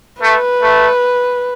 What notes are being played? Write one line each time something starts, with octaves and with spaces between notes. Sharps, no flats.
A3 B4
A3